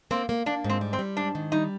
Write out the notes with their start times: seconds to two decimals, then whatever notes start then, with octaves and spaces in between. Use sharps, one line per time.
0.11 A#3 C4
0.29 A#3
0.46 A#3 D4
0.64 G#2
0.70 C4
0.81 G3
0.93 C4
0.99 G3
1.17 G#2 D4
1.35 D#3
1.52 G3 D#4